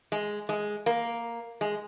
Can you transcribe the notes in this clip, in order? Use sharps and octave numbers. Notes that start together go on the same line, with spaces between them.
G#3
G#3
A#3
G#3